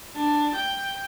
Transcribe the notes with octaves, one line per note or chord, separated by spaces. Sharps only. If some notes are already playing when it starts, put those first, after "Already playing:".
D4
G5